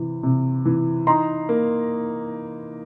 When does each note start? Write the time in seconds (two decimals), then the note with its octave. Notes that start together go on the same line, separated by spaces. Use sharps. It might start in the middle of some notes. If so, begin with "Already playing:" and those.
Already playing: C3 E3
0.23 C3
0.65 E3
1.07 D#4 A#5 C6
1.49 A#3